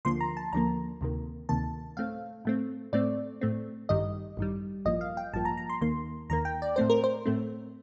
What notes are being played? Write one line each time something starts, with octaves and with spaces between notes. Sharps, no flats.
D2 D3 F3 A#3 C6
A#5
A5
D2 D3 F3 A#3 A#5
D2 C3 D#3 A#3
D2 C3 D#3 A#3 A5
A2 A3 C4 F5
A2 A3 C4
A2 A3 C4 D5
A2 A3 C4
A1 G2 D#3 G3 D#5
A1 G2 D#3 G3
A1 G2 F3 A#3 D#5
F5
G5
A1 G2 F3 A#3 A5
A#5
A#5
C6
D#2 D#3 A#3 C6
D#2 D#3 A#3 A#5
G5
D5
A2 A3 C4 C5
A#4
C5
A2 A3 C4